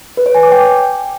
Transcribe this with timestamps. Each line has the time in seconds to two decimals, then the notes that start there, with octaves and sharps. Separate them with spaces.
0.17 B4
0.26 C#5
0.35 G#5
0.43 D6
0.52 G5